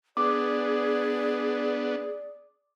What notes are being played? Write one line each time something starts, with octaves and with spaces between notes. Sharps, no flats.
B3 D4 G#4 D5 D6